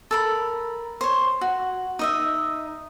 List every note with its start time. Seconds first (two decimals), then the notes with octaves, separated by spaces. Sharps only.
0.11 A4 A#4 B5
1.01 C5 C#5
1.41 F#4
1.99 D#4 D#5 E5